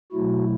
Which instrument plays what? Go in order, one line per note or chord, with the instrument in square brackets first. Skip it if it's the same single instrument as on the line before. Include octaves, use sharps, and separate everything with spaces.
[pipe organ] B2 F#3 A3 E4 F#4